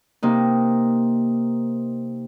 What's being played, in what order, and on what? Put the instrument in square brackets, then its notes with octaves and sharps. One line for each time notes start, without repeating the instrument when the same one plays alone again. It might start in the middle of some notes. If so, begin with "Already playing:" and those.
[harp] C3 A#3 D#4